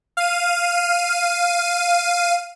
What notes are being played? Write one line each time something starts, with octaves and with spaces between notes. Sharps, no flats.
F5 D#7